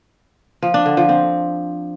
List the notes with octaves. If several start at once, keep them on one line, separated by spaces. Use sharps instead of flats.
F3
D4
D3
F3
C4